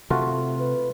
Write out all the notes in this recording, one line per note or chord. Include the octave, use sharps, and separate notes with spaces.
C3 A3 F4 F#4
B4